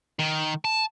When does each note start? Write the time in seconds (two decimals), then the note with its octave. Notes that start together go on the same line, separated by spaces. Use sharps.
0.19 D#3
0.65 A5